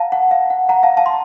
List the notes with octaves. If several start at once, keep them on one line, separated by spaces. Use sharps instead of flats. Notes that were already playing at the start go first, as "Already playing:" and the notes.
Already playing: F5 F#5 A5 A#5
F#5
F5
F#5
F#5 A#5
F5 A5
F5 A5
C6